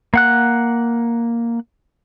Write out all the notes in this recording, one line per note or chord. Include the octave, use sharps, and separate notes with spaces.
A#3 F#5 F#6